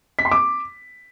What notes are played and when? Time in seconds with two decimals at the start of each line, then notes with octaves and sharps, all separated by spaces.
0.19 B6
0.25 C6
0.31 D6